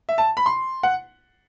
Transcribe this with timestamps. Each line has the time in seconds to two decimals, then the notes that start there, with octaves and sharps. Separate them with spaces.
0.09 E5
0.18 A5
0.37 B5
0.46 C6
0.83 F#5